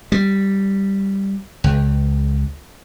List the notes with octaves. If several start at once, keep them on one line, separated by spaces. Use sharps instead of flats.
G3
C#2